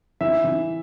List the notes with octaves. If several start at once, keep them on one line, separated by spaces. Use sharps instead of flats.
E3 E5
E3